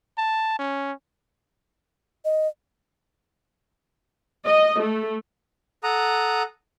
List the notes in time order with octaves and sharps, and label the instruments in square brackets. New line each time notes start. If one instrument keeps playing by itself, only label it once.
[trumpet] A5
C#4
[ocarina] D#5
[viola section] D#5
A3
[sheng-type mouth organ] A4 F#5 A#5 D#6